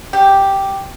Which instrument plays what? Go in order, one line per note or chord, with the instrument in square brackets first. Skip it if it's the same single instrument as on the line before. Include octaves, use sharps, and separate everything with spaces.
[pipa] G4